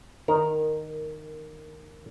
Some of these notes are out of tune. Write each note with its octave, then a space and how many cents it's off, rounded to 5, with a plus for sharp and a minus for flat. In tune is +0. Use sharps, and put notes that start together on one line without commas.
D#3 -15 A#4 +0